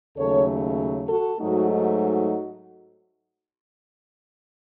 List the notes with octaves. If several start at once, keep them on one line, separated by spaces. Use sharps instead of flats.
D#2 C#3 F#3 A3 A4 C#5
F#4 A4
G#2 F#3 A3 D#4 F#4
D#4 F#4